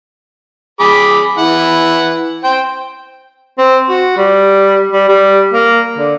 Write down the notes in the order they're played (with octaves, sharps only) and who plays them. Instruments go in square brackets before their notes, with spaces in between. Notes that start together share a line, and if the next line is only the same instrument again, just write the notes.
[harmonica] G#4 B5 D6
E3 E4 F#5
C5 G5
[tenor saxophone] C4
F#4
G3
G3
G3
A#3
D3